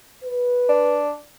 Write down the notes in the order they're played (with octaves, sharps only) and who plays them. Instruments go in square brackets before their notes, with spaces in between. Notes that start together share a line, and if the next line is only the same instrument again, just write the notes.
[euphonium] B4
[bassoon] D4